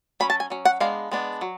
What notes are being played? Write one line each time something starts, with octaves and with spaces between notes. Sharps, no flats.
F#3 C#4 B5
A5
G#5
F#3 C#4
F#5
G#3 B3 D4 F5
G#3 B3 D4
F#3